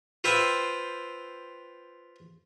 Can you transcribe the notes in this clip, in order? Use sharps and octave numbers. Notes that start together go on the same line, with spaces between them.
F4 B4 C5 E5 G5